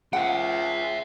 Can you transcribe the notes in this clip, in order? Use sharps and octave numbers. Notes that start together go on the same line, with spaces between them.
C#2 E5 F#5 G5